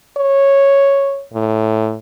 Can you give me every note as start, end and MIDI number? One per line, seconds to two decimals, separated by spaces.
0.17 1.23 73
1.34 1.96 45